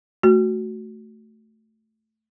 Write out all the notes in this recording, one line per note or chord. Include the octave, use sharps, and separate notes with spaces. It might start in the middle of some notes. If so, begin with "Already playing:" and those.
A3 F#4